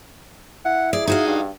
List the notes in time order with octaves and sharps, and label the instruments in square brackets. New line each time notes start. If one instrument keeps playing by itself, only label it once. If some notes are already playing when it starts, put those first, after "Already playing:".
[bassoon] E4 [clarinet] F#5
[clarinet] G#4 [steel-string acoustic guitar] D5
[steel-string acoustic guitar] D#4 F#4 F5 [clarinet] G#4
[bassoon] G2